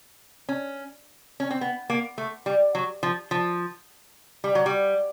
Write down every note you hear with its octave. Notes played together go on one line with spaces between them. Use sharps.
C#4
C#4
C4
B3
A#3
A3
G3
F#3
F3
F3
G3
F#3
G3